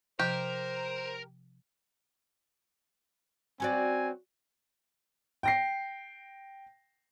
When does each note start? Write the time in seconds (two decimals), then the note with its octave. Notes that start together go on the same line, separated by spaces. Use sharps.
0.19 C3 F3 G4 A#4 C5 G6
3.60 C4 C#4 F#4 D5 G#5
5.43 G5 A#6 C7